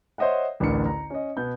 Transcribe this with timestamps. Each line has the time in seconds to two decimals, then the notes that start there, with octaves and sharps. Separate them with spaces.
0.18 C5 C#5 D#5 E5 F#5
0.60 A1 D2 D4 A#4 C#7
0.86 A#5
1.10 C#4 D#5
1.37 B2 B3 G6